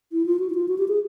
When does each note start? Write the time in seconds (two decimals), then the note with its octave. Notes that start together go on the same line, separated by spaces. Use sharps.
0.12 E4
0.26 F4
0.39 F#4
0.50 E4
0.55 F4
0.68 F#4
0.78 G4
0.88 G#4